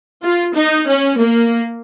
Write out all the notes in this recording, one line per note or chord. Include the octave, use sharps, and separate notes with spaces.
F4
D#4
C#4
A#3